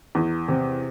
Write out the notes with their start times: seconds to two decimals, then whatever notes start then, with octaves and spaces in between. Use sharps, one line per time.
0.15 E2
0.48 C3